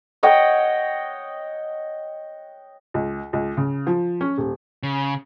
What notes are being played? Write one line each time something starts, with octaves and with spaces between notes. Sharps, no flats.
C#5 D#5 F#5 G5
C#2
C#2
C#3
F3
C#4
D#1
C#3